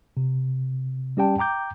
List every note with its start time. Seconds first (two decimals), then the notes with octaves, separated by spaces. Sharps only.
0.17 C3
1.17 G3 C#4 G4 D5 G5 A5
1.38 G5 A#5 D6 G6